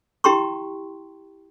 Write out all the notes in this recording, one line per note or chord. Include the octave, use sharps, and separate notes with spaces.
E4 G4 G5 A#5 C6 C#6